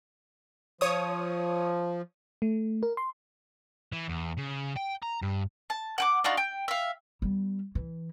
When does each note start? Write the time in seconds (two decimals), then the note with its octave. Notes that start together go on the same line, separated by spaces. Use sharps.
0.81 F3 C#5 D#6
2.42 A3
2.83 A#4
2.97 C6
3.92 E3
4.09 E2
4.37 C#3
4.76 G5
5.02 A#5
5.22 G2
5.70 A5
5.98 F#5 G5 D6
6.24 D4 D#4 F4 F#4
6.37 G5
6.68 E5 F5
7.22 G3 B3
7.75 E3